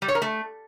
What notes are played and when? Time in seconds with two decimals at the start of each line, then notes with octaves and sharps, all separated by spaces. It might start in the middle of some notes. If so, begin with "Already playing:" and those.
0.02 G3
0.08 C#5
0.15 A#4
0.22 A3